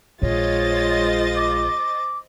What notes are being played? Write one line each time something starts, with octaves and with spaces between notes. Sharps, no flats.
A#1 G#3 F4 C5 C#5 D#5 A6
D6